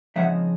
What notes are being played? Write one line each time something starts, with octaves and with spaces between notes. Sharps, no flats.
C#3 F3 G#3 C4 D#4 E5 F#5